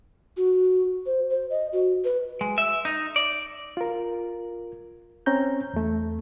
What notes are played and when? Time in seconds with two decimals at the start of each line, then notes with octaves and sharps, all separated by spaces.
0.37 F#4
1.06 C5
1.30 C5
1.50 D#5
1.73 F#4
2.04 B4
2.41 G#3
2.58 E5
2.85 D#4
3.16 D5
3.77 F4 A#4
5.26 C4 C#4 A#5 G6
5.73 E2 A3